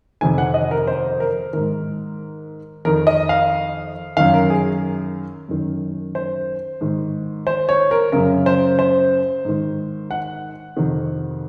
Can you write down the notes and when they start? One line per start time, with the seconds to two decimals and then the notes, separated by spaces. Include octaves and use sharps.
0.21 F2 C3 D#3 G#5
0.38 F#5
0.54 D#5
0.71 A#4
0.87 C5
1.20 A#4
1.53 G#2 D#3 A#4
2.85 F2 D#3 A#4
3.07 D#5
3.29 F5
4.17 F#2 D#3 F5
4.34 A#4
4.50 G#4
5.49 F#2 D#3
6.15 C5
6.81 G#2 D#3
7.47 C5
7.69 C#5
7.91 A#4
8.12 F#2 C#3 A#4
8.46 C5
8.79 C5
9.45 G#2 D#3
10.11 F#5
10.77 F2 C3 D#3